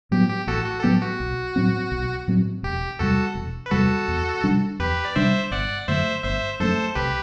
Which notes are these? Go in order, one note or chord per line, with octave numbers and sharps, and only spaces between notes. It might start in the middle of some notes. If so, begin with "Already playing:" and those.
A2 F#3 B3 G4
G4
A1 F#4 A4
F#4
A4
A2 F#3 B3 G4
F#4
B1
A2 F#3 C4
B1
A2 F#3 C4
E1 G4
E2 C3 G3 F#4 A4
E1
B4
E2 C3 G3 F#4 A4
E2
C3 G3 D4
E2 G4 B4
D5
C3 G3 D4 C5 E5
G1 D5 F#5
F#2 D3 A3 C5 E5
G1 C5 E5
F#2 D3 A3 A4 C5
C2 G4 B4